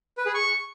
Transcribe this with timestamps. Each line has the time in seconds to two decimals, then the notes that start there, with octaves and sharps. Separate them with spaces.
0.17 B4
0.26 G#4
0.34 C#6